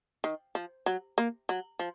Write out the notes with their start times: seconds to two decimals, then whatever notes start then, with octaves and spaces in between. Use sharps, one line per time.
0.24 D#3
0.55 F3
0.86 F#3
1.18 A#3
1.49 F#3
1.79 F3